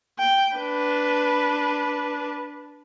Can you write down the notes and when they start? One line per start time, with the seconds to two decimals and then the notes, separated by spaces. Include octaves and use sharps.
0.19 G5
0.56 D4 B4